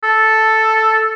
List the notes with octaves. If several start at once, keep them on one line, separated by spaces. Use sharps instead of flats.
A4